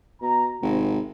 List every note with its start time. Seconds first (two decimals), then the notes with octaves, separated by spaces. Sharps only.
0.22 B2 A#5
0.62 G#1 C3